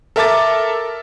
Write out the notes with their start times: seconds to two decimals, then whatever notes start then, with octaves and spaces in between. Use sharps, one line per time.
0.16 A4 A#4 E5 A5 D6 A6